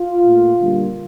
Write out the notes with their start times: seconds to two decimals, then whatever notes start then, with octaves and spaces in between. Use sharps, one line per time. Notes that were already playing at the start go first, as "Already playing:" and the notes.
Already playing: F4
0.24 A#2 A3
0.59 D3 G3 A#3